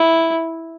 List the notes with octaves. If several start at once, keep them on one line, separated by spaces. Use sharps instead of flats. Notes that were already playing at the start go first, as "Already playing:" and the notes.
Already playing: E4